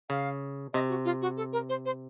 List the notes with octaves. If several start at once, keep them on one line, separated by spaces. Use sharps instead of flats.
C#3 F5
C3 D#5
F#4
F4
F#4
A4
A#4
C5
C5